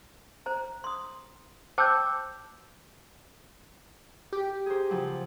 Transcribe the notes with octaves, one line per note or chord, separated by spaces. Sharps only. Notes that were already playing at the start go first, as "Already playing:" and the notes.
C5 A#5
C6 D#6
C5 G5 A5 D6 E6 G6
G4
G#4 A#4 C5
C#3 F3 F#3